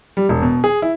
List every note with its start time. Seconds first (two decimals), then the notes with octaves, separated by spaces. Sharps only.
0.17 G3
0.29 E1
0.42 B2
0.64 G#4
0.82 E4